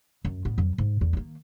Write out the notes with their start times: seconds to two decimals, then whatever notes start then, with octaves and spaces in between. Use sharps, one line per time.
0.25 F#2
0.45 A2 B3
0.58 F2 F#3
0.78 G#2
1.01 E2
1.13 D#3 A#3